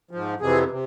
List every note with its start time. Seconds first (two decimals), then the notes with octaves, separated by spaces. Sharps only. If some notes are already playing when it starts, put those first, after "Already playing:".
0.11 G#2 F3
0.40 F2 C3 E3 G#4
0.70 C3